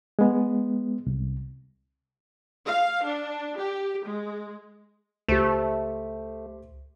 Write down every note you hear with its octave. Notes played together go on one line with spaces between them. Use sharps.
G#3 B3
C2
F5
D4
G4
G#3
C#2 A3 G4 C5